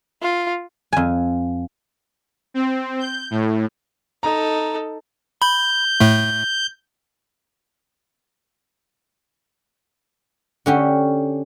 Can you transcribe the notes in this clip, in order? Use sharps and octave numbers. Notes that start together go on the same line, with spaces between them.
F4
F2 G#5
C4
G6
A2
D#4 A4 A#5
B5 G6
A2 A3
D3 C#4 G4